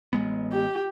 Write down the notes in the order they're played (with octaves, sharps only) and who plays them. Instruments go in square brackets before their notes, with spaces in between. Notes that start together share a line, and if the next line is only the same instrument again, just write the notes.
[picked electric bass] A1 G#3 B3
[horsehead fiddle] G4